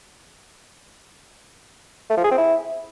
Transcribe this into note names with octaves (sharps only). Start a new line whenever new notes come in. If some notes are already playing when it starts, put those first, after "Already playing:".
A3
F3
G#4
C4
E4